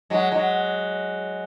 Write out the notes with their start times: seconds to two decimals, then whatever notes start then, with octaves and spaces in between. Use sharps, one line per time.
0.10 F#3 G#3
0.32 F#3 G#3